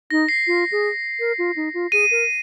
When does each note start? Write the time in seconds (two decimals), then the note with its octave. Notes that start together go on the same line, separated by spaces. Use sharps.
0.11 D#4 A#6
0.29 C7
0.47 F4
0.72 G#4
1.20 A#4
1.38 F4
1.56 D#4
1.74 F4
1.92 G#4 D#7
2.11 A#4